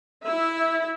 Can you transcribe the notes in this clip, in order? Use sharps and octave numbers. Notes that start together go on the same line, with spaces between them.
E4 E5